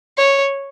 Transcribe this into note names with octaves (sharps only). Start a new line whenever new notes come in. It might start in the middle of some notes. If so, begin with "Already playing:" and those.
C#5